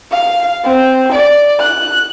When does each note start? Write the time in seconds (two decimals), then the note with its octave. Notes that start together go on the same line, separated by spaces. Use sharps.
0.12 F5
0.64 C4
1.12 D5
1.60 F#6